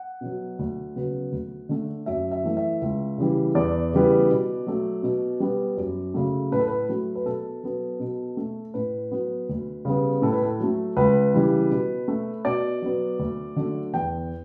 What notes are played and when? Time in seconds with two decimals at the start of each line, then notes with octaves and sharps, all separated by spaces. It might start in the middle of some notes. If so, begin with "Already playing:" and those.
Already playing: F#5
0.21 B2 F#3
0.59 D2
0.96 C#3 F#3 B3
1.32 D2
1.69 D3 A3
2.06 F#2 E5
2.31 E5
2.44 E3 A3
2.57 E5
2.81 C#2
3.18 C#3 E3 G3
3.55 E2 D5
3.93 C#3 E3 G3 B3
4.30 B2
4.67 F#3 A3
5.03 B2
5.40 G3 B3
5.77 F#2
6.14 C#3 F#3 A3
6.52 A2 B4
6.59 A4
6.68 B4
6.89 F#3 A3
7.15 B4
7.25 B2 A4
7.63 F#3 B3
8.00 B2
8.37 A3
8.74 A2 B4
9.12 F#3 B3
9.49 D2
9.85 C#3 G3 B3
10.22 A2 A4
10.33 B4
10.43 A4
10.60 F#3 A3
10.97 C#2 B4
11.34 C#3 E3 G3
11.71 B2
12.08 A3
12.45 B2 D5
12.82 F#3 B3
13.19 D2
13.56 D3 F#3 A3
13.94 E2 G5